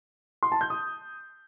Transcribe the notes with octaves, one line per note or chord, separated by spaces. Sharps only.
C6
A5
G6
D#6